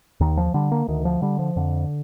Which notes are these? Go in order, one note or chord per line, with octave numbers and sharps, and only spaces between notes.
D#2 D#3
F3
D3 G3
A#3
D2 D#3
F3
D3 G3
F3
F2 D3